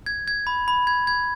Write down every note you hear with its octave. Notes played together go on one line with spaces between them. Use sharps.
G#6
G#6
B5
B5
G#6
G#6